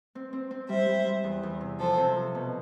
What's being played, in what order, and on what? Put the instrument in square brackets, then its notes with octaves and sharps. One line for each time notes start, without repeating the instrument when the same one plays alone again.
[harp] C4
C4
C4
[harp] G3 [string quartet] C5 E5
[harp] G3
G3
E2
E2
C3
[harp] F3 [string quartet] A4 C5
[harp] C3
F3
B2